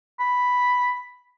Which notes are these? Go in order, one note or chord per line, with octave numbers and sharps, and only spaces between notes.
B5